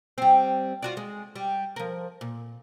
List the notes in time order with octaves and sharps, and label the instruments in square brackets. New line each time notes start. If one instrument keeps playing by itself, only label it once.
[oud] G3 C4
F4 F#4 D5
G#3
G3
F3 A#4
A#2